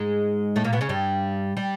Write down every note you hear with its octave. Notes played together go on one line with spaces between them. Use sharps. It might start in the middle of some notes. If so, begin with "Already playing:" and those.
Already playing: G#2 G#3
A2 A3
A#2 A#3
B2 B3
C#3 C#4
G2 G3
G3